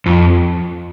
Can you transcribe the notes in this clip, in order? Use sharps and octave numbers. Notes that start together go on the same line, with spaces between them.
F2